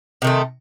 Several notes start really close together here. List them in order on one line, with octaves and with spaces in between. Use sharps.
C3 D#3 A3